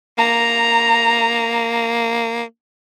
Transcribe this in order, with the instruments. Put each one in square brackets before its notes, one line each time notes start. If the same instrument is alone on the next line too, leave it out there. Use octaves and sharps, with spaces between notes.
[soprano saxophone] A#3 [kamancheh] A#5